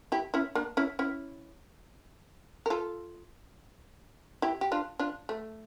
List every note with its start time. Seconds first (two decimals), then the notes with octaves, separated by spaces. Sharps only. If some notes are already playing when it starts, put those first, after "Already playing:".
0.12 E4 G4
0.34 C#4 E4
0.55 A#3 D4
0.77 C#4 E4
0.99 C#4 E4
2.66 A#4
2.70 F4 A4
4.42 E4 G4
4.61 G4
4.72 D4 F4
4.99 D4 F4
5.29 A3